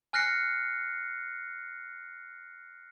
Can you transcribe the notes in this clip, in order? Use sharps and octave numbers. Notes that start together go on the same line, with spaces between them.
G#5 F6 F#6 A#6 C7 C#7